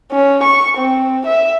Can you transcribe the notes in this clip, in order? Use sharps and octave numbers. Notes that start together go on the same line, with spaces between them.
C#4
C#6
C4
E5